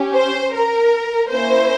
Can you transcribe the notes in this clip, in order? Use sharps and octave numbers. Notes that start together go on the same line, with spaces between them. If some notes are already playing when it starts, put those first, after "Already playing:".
Already playing: C#4 G4
C5
A#4
A#3 C#4 E4 C5